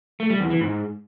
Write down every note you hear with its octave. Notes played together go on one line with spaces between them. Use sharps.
A3
G3
E2
E3
G#2